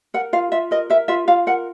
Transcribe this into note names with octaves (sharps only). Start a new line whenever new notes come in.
A#4 F#5
F4 F5
F4 E5
A#4 D#5
A#4 E5
F4 E5
F4 F5
A#4 F#5